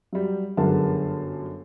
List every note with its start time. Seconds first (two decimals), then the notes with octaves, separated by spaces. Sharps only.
0.13 F#3 G3
0.57 G1 F#2 D3 G#4 A#4 A5